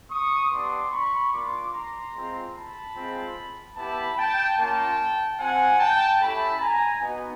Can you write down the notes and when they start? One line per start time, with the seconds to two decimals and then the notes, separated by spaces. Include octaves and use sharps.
0.11 C#6 D#6
0.51 B3 D4 G4 C6 D6
0.92 B5 C#6
1.33 A#3 D4 F4 C6 D6
1.73 A#5 C6
2.14 G#3 C4 F4
2.54 A5 B5
2.95 G#3 C4 F4
3.76 B3 E4 G4 A5 B5
4.17 G5 A5
4.57 A#3 C#4 F4 G5 A5
5.39 C4 F4 F#5 G#5
5.80 G5 A5
6.20 A3 C#4 E4 G4 A5 B5
6.61 G#5 A#5
7.01 B3 D#4 F#4